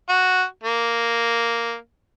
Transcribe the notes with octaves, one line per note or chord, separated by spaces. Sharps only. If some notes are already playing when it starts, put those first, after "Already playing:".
F#4
A#3